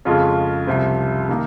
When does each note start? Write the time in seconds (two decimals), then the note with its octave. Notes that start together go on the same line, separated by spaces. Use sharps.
0.05 F2 C#3 G#3 C#4 F4
0.67 C2 C3 F3
1.29 D#3 A#3